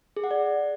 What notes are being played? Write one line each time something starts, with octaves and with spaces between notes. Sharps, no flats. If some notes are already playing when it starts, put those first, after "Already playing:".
G#4
F#5
D5